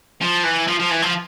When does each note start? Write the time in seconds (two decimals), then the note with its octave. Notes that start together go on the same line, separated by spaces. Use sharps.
0.21 F3
0.44 E3
0.68 F3
0.80 F3
0.91 E3
1.02 F3